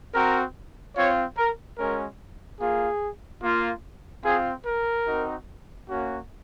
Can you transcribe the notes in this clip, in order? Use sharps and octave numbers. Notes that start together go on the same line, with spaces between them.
C4 F#4 A#4
C4 F4 C#5
A#4
G#3 C#4 F#4 A#4
A#3 F4 G#4
A#3 F4
C4 F4 G#4
A#4
C4 D#4 F#4
A#3 C#4 F#4